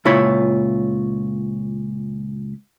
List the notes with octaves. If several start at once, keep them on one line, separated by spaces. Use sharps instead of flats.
C#2 A#2 E4 F4 C#5 B5